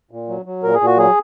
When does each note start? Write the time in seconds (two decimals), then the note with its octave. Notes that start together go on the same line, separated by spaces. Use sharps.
0.11 A#2
0.29 F#3
0.46 F#3
0.63 A#2 A#4
0.74 G#4
0.80 A#2
0.86 F#4
0.98 F#3 G#4